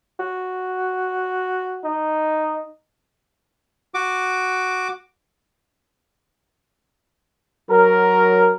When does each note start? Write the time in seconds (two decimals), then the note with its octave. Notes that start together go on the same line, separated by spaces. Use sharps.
0.19 F#4
1.85 D#4
3.94 F#4 D6
7.69 F#3 A#4